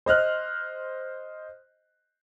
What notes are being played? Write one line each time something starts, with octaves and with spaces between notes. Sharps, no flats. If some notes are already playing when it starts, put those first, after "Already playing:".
C5 D#5 F6 F#6